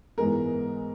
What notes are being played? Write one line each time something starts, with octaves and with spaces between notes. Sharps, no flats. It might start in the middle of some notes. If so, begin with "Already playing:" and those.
G#2 E3 G#3 B3 A#4